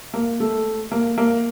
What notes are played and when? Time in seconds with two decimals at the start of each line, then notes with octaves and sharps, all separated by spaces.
0.14 A#3
0.40 A3
0.92 A#3
1.18 A#3